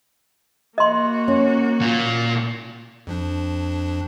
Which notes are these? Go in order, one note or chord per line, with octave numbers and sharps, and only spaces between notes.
A#3 F#4 D#5 C6
C#4
A#2
F2 F3 D4